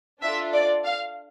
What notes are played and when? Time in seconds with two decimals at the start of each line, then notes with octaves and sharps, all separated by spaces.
0.23 D4 F4 A4 E5
0.54 D5
0.85 F5